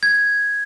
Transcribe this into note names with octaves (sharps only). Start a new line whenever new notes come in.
G#6